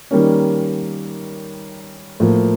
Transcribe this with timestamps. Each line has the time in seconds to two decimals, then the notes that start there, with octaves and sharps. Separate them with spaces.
0.11 D#3 G3 A#3 C#4
2.20 A2 F3 A#3